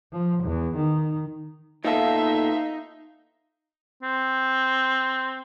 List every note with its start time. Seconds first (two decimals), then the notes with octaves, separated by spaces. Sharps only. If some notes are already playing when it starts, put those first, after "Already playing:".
0.12 F3
0.44 E2
0.76 D#3
1.84 A#2 B3 D#4 A4 E5 F5
4.03 C4